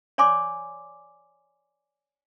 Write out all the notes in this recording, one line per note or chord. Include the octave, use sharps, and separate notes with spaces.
C#5 D5 G#5 C6 D6